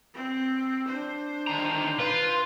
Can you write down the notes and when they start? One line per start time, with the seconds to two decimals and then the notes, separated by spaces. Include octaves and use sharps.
0.14 C4
0.89 D4 C5
1.47 D3 D#3 A#5
2.00 F4 B4